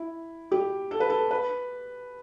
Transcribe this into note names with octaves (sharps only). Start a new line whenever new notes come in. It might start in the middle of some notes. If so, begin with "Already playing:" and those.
Already playing: E4
G4
A4
B4
A4
B4